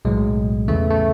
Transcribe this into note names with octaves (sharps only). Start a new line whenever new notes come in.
B1 A2 F#3 G#3
E2 C#3 E3 A3
A3